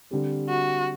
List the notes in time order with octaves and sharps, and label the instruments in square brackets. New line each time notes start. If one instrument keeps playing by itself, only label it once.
[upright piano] D3 G3 C4 G4
[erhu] F#4